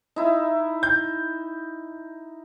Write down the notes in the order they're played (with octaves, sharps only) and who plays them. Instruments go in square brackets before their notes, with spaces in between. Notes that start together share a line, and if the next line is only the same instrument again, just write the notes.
[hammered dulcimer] D#4 E4
[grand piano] G6